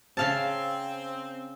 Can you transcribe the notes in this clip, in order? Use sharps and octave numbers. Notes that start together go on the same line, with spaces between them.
C#3 C4 F5 A5